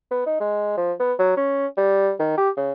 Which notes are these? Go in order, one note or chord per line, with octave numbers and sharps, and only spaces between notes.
B3
D#4
G#3
F3
B3
F#3
C#4
G3
D#3
G4
C#3